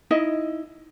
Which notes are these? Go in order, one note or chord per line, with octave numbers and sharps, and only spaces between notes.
D#4 E4 D#5